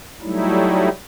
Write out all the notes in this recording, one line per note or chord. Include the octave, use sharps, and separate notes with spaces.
F#3 G3 A3 D#4 E4